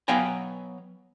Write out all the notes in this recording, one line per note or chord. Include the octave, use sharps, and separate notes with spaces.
F#3 B3 F5 G5 G#5 A#5